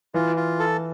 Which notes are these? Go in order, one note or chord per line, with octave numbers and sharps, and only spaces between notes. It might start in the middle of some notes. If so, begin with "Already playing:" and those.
E3 F4
F4
A4